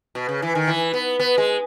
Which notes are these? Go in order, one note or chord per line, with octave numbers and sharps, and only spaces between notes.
B2
C#3
E3
D#3
E3
B3
B3
G#3